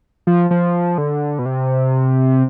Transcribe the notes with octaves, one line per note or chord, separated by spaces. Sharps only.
F3
F3
D3
B2
C3